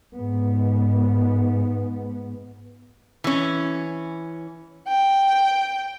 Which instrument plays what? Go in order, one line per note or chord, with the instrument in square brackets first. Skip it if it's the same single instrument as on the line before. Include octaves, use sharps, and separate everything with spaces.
[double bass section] G#2 B3
[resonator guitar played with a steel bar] E3 C#4
[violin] G5